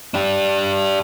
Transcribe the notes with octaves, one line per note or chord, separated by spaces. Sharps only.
D4 G4